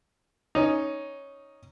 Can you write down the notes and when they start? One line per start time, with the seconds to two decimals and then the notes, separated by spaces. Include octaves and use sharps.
0.55 C#4 D#4